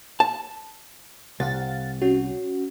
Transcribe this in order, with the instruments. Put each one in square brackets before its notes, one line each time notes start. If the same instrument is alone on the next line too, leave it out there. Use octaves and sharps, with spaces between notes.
[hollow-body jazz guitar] A5
[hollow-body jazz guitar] C2 [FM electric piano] F5 F#5 A6
[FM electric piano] C#4 F#4